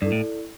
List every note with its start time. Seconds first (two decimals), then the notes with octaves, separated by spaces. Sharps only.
0.01 G2 E4 A4 D5
0.12 A2